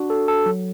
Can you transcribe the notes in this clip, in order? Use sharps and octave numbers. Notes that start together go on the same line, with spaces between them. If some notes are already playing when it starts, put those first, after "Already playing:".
Already playing: D4 F#4
A4
A4
F#3